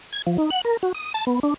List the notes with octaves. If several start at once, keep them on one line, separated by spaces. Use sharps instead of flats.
G#6
F3
D#4
F#5
A#4
F#4
D#6
A5
B3
D4